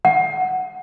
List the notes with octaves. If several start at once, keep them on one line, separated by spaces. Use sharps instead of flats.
F#5